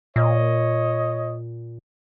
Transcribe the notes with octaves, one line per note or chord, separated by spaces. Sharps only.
A#2 C#5 D#5